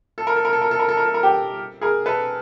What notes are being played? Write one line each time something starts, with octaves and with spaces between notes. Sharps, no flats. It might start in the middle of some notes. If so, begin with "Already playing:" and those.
A4
A#4
A4
A#4
A4
A#4
A4
A#4
A4
A#4
A4
A#4
G4 A4
G#4 A#4
A4 B4